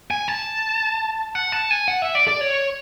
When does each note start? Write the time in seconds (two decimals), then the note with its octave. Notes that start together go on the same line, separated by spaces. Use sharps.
0.11 G#5
0.28 A5
1.35 F#5
1.52 A5
1.71 G#5
1.88 F#5
2.02 E5
2.15 D5
2.28 D5
2.41 C#5